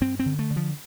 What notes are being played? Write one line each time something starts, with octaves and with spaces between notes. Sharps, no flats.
G2 C4
C4
D3
A3
D3
F3